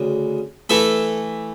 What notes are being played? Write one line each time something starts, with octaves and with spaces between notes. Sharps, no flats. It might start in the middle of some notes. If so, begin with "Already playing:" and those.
Already playing: D2 C#3
E3 A3 A4